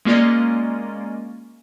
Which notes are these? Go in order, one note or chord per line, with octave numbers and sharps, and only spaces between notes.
G#3 A#3 C#4 F4 D5 D#5